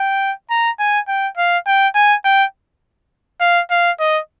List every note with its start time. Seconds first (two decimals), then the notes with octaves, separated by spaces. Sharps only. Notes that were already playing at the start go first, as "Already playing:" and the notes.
Already playing: G5
0.50 A#5
0.79 G#5
1.08 G5
1.37 F5
1.67 G5
1.95 G#5
2.25 G5
3.41 F5
3.70 F5
4.00 D#5